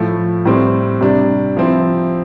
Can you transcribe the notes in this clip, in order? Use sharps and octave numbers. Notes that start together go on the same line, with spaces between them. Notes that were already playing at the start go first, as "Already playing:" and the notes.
Already playing: A2 F3 A3 E4
A2 G3 C4
C3 G3 D4
F3 C4 E4